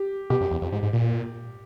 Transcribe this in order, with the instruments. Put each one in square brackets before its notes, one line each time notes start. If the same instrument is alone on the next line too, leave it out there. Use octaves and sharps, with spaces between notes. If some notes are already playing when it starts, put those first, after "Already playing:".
Already playing: [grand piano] G4
[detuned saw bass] B2 [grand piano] G4
[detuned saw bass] F#2
E2
F2
G#2
G#2
A#2